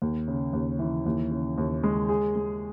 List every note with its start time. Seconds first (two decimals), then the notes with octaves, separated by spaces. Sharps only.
0.02 D#2
0.28 C#3
0.53 D#2
0.79 E3
1.06 D#2
1.31 C#3
1.58 D#2
1.83 G#3
2.09 G#4
2.35 G#3